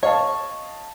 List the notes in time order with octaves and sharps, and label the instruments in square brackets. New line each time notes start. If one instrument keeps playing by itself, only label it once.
[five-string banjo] C#5 [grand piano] D#5 F5 A5